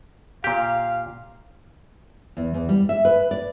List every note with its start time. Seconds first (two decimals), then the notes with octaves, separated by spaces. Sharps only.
0.44 A#2 G4 F5
2.37 E2
2.54 E2
2.69 G3
2.89 E5
3.05 B4
3.31 D5